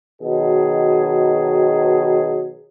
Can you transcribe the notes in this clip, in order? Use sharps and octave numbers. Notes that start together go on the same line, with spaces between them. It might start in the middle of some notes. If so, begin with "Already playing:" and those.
B2 D#3 F#3 G#4